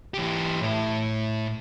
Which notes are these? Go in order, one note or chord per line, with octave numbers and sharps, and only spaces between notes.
E3 G4
A2 E4